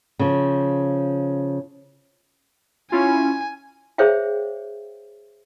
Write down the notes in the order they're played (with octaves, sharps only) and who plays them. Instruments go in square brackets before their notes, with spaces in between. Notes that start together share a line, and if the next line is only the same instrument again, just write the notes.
[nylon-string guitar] C#3 F3
[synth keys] C#4 E4 F4 [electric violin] G#5
[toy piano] G#4 C5 C#5 E5 F5 G5